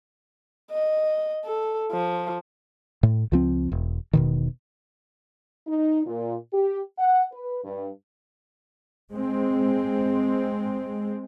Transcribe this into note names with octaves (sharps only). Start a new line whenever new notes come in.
D#5
A4
F3
A2
C#2 F3 C4
E1
E1 B2 D#3
D#4
A#2
G4
F#5
B4
G2
G#3 C4